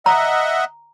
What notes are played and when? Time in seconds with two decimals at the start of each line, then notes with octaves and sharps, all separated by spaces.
0.06 D#5 E5 F#5 A#5